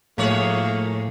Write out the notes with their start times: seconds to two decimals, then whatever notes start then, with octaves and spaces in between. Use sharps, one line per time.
0.18 A2 F3 A3 A#3 G#4 C#5